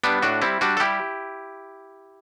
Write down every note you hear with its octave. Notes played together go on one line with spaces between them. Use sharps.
G3 B3 D4
A2 D4 F#4
G3 C4 E4
G3 D4 F#4
A4
G3 E4 G4